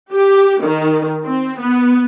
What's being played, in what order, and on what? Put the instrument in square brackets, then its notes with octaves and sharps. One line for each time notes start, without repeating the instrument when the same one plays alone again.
[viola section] G4
D#3
C4
B3